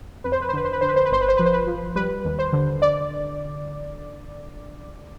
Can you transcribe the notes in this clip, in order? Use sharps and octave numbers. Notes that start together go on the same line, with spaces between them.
F2 B4
C5
B4
C5
D3 B4
C5
B4
D3 C5
B4
C5
B4
G1 C5
B4
C5
F3 B4
C5
B4
F3
G3 B4
D#2
C5
D3
D5